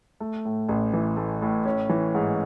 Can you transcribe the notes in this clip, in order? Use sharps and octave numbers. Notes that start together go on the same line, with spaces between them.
A3
A2
A1
E3
A3
A2
C#4
E3
G#2